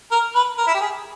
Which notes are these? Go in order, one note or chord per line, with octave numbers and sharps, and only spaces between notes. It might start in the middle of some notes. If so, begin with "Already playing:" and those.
A#4
B4
A#4
E4
G4
G#4